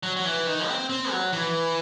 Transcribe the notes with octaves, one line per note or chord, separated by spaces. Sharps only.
F#3
F#3
E3
D#3
C4
C4
F#3
E3